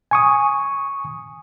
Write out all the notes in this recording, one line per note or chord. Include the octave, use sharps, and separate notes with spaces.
G#5 C#6 D#6